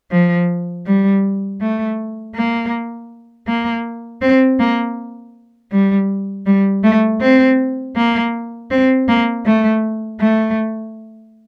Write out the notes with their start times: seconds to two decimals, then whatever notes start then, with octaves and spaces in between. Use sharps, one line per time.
0.12 F3
0.86 G3
1.61 A3
2.36 A#3
3.47 A#3
4.22 C4
4.60 A#3
5.72 G3
6.46 G3
6.84 A3
7.21 C4
7.96 A#3
8.71 C4
9.08 A#3
9.46 A3
10.20 A3